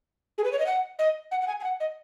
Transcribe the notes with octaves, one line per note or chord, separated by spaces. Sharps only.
G#4
B4
C#5
D#5
F#5
D#5
F#5
F#5
G#5
G#5
F#5
D#5